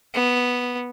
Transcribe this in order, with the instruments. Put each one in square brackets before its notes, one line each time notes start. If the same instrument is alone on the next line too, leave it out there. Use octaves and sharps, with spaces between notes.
[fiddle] B3